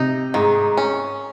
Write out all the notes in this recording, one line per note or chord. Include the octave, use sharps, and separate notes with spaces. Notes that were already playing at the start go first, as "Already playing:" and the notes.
Already playing: C3 D#4
G#2 D#3
C#4